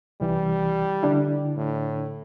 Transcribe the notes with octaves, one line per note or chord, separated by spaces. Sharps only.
C2 E3 G3
D3 D4 E4
A2